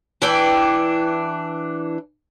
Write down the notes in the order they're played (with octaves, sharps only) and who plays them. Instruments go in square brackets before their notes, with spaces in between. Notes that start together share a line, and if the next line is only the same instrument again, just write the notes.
[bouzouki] E3 D4 G5